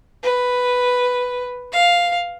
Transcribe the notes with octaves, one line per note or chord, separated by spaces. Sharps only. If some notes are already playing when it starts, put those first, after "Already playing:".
B4
F5